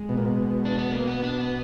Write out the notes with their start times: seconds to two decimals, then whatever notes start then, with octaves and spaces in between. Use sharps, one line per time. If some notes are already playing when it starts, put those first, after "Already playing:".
Already playing: G#3
0.09 B2
0.17 A#2
0.25 B2
0.65 D4
0.78 B3
0.91 A#3
1.08 B3
1.24 D4
1.40 B3